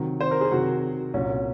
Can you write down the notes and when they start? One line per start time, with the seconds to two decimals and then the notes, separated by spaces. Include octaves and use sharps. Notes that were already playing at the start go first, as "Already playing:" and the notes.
Already playing: C3 D#3 F#3
0.21 C5
0.31 A#4
0.41 G#4
0.51 C3 D#3 F#3 F#4
1.14 C2 A#2 F#3 C#4